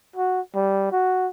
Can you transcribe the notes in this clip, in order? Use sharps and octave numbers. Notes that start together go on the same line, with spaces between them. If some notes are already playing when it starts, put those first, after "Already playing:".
F#4
G3
F#4